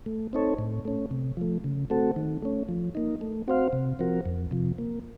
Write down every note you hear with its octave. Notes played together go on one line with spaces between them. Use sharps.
A3
C4 D#4 A4 C#5
A2
A3 C#4
C3
F3 A3
C#3
A3 C4 F#4 A4
D#3
A3 C#4
F3
A#3 D#4
A3
C4 F#4 C5 F5
C3
F3 C4 F#4 A#4
F2
C3 F3
A#3